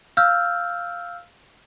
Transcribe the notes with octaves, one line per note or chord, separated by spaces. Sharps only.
F5 E6 F6 G6